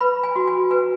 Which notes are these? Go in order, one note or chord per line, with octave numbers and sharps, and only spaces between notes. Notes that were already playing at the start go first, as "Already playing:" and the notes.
B4 B5
G#5
F#4
G#5
B4 G#5